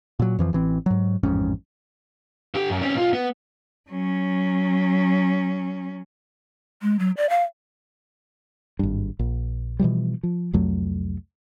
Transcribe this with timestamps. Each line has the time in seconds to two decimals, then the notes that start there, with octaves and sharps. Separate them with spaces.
0.19 A#2 F#3
0.39 F2 E3 F3
0.53 A1 E3 C4
0.86 G#2 F#3
1.23 A1 F2 G#2 C#4
2.54 D3 G4
2.69 F#2
2.82 C4 C#4
2.95 B1 F4
3.13 B3
3.90 F#3 C#4
6.82 G#3
6.99 F#3
7.17 D5
7.30 F5
8.79 G#1 G2
9.19 A#1
9.79 B2 E3 F3 G3
10.23 F3
10.53 C2 F2 F#3 A3